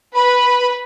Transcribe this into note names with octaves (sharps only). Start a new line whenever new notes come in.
B4 B5